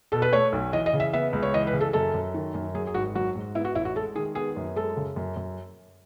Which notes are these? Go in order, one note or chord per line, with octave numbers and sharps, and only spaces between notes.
B2 A4
B4
A3 C#5
B1
E3 D#5
D#5
C#3
E5
B3 E5
C#2
C#5
E3 D#5
B4
C#3
A4
F#2 A4
F#2
D#3
F#2
F#3 G#4
G#4
G#1 F#4
F#3 F#4
G#2
B3 E4
F#4
A1 E4
F#4
G#3 A4
D#3 G#4
B3 G#4
F#2
G#3 A4
C#3
F#2
F#2